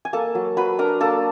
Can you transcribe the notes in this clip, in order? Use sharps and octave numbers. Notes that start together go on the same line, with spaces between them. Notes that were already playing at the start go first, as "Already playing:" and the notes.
G#5
A#3 A4 A5
F#3
F#3 B4 B5
D4 A#4 A#5
A#3 A4 A5